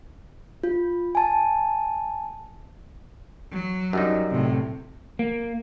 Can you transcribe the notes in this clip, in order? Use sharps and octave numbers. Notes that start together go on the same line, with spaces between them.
F4
G#5 A5
F#3
F#2 G3 D#4
A2 C3
A#3